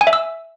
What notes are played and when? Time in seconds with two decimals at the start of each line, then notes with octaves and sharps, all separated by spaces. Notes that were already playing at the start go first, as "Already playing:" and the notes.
0.01 G#5
0.07 E5
0.13 E6